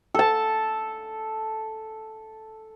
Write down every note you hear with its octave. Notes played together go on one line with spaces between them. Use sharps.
A4 A5